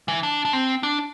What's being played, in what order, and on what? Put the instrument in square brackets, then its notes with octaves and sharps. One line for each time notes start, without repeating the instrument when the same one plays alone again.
[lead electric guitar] E3
D4
D4
C4
D4